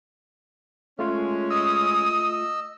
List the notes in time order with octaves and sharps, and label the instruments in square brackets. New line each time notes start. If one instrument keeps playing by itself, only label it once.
[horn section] G#3 C#4 [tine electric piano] A3 F4
[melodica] D#5 E6 [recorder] D#6